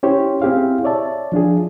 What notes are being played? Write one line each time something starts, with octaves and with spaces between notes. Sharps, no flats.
C#4 E4 G4 C5 C#5
C4 E4 G4 G#4 F5
C#5 D5 E5 A5
F3 D4 F4 G#4